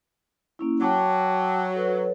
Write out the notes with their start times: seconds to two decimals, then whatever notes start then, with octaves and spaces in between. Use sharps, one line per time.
0.59 A#3 C#4 E4
0.81 F#3 G5 A5 D6
1.75 A4 B4 C#5